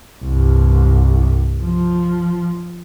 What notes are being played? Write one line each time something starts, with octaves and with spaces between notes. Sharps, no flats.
C2 G2
F3